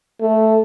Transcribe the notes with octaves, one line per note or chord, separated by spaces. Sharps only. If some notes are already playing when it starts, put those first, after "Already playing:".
A3